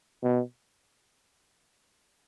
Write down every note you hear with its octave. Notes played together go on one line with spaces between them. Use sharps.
B2